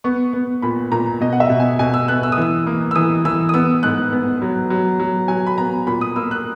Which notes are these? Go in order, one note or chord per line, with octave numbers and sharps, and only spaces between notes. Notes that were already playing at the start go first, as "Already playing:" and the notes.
B3 C#6
B3
A#2 B5
A#2 A#5
B2 D#5
F#5
E5
B2
G#5
B2 G#5
E6
B3 F#6
E6
D#6
E3 E6
A#3
E6
E3 D#6
E3 E6
D#6
B3 E6
G#2 F#6
B3
F#3
F#3
F#3
F#3 G#5
B5
B3 A#5
A#2 B5
D#6
A#3 E6
F#6